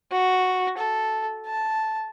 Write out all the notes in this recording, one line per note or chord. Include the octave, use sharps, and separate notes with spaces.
F#4
A4
A5